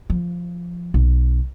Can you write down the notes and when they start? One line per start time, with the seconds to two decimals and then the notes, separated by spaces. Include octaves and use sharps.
0.10 F3
0.94 B1